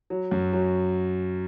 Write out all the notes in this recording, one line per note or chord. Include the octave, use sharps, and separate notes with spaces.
F#3
F#2
F#3